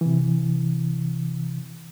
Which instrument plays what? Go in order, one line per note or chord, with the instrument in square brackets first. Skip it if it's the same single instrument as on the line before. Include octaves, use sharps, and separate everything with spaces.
[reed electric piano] C3 E3